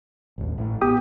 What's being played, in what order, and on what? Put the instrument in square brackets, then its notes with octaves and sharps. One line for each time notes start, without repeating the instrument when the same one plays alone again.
[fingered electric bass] A1 D#2
A1 A2
[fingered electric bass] B3 [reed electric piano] G4 D#6